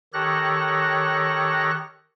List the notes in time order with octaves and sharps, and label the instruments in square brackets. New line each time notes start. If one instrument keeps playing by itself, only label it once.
[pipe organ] D#3 G4 A4 C#5 F#6 A#6